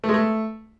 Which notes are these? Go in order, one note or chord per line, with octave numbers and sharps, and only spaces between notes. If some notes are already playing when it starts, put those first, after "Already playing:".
A3
G#3
A3